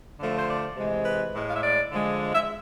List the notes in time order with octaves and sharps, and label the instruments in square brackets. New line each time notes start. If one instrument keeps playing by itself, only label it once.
[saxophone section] D3 F3 A3
C5
D5
C3 E3 G#3
B4
A2 G#3
F5
E5
D5
D3 F3 G#3
E5